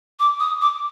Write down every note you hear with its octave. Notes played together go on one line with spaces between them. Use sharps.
D6
D#6
D6